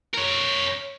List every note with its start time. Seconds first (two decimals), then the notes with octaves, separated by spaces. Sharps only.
0.14 A#4 C#5